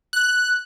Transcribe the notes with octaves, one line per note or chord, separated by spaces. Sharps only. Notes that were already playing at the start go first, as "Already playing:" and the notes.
F#6